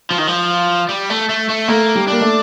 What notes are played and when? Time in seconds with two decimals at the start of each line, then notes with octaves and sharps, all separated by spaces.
0.11 F3
0.18 D#3
0.27 F3
0.89 G3
1.10 A3
1.29 A3
1.49 A3
1.68 A3 A#3
1.95 G3
2.07 A#3 D4
2.21 A3